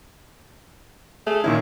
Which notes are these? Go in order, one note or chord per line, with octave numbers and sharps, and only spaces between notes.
A3 G#4
A#2 D#3 C#4 E4